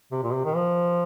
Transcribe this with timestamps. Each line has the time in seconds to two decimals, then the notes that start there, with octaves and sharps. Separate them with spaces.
0.12 C3
0.23 A#2
0.33 C3
0.45 D#3
0.55 F3